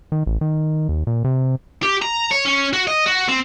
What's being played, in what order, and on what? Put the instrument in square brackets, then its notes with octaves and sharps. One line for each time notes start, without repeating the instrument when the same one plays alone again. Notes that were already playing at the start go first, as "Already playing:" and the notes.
[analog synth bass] D#3
A1
D#3
D#2
A#2
C3
[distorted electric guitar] G4
A#5
C#5
C#4
F#4
D#5
F#4
C4